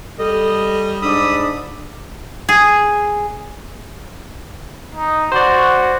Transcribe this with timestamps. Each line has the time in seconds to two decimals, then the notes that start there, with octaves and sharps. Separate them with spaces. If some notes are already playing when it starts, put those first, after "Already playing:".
0.19 G3 A4 D#5
1.02 G#2 D4 B5 D#6 E6
2.49 G#4
4.95 D#4
5.32 F#4 C5 D5